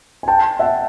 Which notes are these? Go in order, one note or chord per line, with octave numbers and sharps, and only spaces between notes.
G#5
G5 A5
E5 F#5